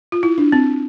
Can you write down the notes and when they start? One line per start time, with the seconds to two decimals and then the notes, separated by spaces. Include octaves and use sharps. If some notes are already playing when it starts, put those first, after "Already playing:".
0.12 F4
0.23 E4
0.38 D4
0.52 C4